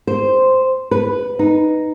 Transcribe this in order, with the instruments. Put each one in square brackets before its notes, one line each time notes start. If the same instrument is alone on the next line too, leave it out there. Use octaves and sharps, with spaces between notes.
[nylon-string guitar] C5
B4
D#4